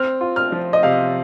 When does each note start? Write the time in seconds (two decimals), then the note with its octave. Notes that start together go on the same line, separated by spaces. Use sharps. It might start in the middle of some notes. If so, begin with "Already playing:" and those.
Already playing: C4 F6
0.21 F4
0.36 F6
0.52 F3
0.73 D#5
0.83 C3 F5